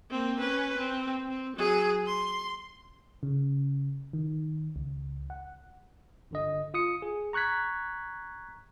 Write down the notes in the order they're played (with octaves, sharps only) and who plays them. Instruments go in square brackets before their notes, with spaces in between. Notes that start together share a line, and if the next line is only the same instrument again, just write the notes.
[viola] A#3 C4
C#4 B4
C4
C4
F#3 G#4
C6
[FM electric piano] C#3
D#3
C#2
F#5
[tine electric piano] G1 D3 D#5
F4 D#6 C#7
G#4
A#5 C#6 F#6 G#6 B6